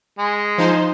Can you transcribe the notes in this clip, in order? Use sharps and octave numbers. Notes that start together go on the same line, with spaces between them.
G#3
F3 D#4 C5